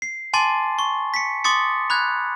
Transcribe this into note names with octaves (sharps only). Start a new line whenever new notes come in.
C7
G#5 A5 C6 D6 A6
C#6
B6 C#7
C6 D6 D#6 A6 C#7
B5 F#6 G#6